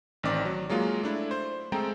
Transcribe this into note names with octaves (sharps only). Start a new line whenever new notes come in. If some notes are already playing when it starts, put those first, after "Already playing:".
A1 D#3 C4 D5
F#3
F#3 G#3 A#3 F4
A3 D4 E4
C5
G#3 A3 C4 A4 G5 A#5